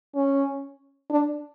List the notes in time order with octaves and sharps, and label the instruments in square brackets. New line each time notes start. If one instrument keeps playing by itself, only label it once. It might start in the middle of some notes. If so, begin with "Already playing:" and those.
[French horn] C#4
D4